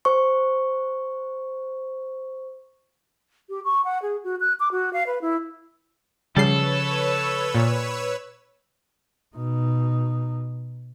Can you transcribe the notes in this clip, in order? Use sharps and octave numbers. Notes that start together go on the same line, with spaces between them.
C5 C#6
G4
C#6
F#5
G#4
F#4
F#6
D6
F#4
F5
B4
E4
C#3 F3 G3 A4 B4 C#5 E6 C7
A#2
B2 D#4